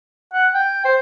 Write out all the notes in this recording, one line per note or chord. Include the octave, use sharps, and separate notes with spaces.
F#5
G5
C5